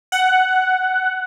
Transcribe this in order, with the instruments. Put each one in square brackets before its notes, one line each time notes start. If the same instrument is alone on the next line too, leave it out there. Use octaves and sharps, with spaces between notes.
[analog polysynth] F#5